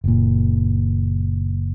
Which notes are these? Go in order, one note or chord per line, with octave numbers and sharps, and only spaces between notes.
F#1 A#2